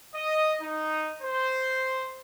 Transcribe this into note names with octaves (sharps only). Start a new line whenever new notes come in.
D#5
D#4
C5